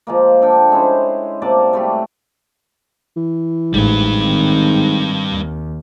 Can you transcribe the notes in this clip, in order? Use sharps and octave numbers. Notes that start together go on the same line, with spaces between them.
F3 G#3 A#3
D4 A4 G5
G#3 C#4 E4 C5
C3 A#3 D5 A5
G3 A3 F#4
E3
A1 G#2 G3 B4
D#3 C4
D#2